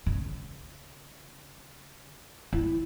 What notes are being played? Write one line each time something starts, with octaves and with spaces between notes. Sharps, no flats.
C#3
E4